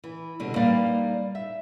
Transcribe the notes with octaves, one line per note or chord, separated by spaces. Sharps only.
E3
B2 D3 G3
G3 A#3 D#4 B4 D5 F5
E5